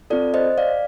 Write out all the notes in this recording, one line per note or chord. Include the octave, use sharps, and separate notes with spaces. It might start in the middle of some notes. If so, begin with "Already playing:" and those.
C4 F4 A4 D5
C5 D#5
D5 F5